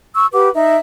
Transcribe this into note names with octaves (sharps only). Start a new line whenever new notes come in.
C#6 E6
G4 B4 F#5 D6
D#4 E5